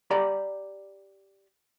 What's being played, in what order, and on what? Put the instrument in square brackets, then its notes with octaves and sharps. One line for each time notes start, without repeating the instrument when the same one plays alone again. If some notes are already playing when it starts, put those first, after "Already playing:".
[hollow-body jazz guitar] G4 D5 A#5 B5